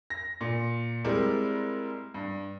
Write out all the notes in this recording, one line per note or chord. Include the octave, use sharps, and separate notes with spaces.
A#6
A#2
G3 G#3 C4 E4 A#4 D5
G2